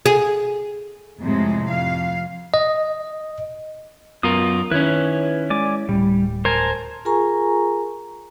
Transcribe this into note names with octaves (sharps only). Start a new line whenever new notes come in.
G#4
F2 A2 C3 G#3
F2 F5
D#5
F#2 B3 F4 A#4 D#6
D#3 C#4 E4 B4 C#5
G#3 D5 G#5 D6
D1 A2 G3
A#4 C5 G#5 A5
F4 G#4 A#4 G#5 A#5 C#6